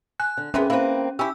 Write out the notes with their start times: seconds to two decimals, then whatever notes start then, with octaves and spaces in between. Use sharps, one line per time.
0.20 G#5 F#6
0.37 D3
0.54 F2 E3 A#3 B3 C#4 G#4 E5
0.70 A#3 C4 E4 B4
1.19 C#4 E4 G4 E6